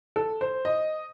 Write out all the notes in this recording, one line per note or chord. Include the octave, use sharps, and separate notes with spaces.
A4
C5
D#5